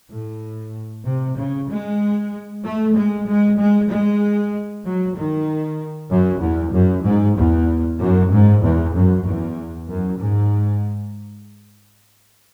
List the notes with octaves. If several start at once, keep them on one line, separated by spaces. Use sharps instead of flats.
A2
C3
C#3
G#3
A3
G#3
G#3
G#3
G#3
F#3
D#3
F#2
E2
F#2
G#2
E2
F#2
G#2
E2
F#2
E2
F#2
G#2